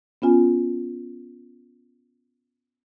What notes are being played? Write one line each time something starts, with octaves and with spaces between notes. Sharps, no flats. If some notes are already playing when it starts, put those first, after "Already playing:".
B3 C#4 F4 G#5